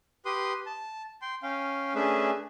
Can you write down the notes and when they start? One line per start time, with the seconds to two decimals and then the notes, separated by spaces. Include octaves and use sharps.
0.26 G4 B4 C6 D#6
0.66 A5
1.22 G5 C6
1.43 C#4 F5 G5
1.95 A3 C#4 D4 G#4 B4 E5